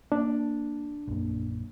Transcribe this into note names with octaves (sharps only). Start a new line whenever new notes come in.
A#3 D4
A#1 F#2 A#3